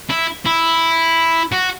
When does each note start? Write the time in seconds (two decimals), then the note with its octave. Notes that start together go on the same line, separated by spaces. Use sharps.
0.09 E4
0.46 E4
1.52 F#4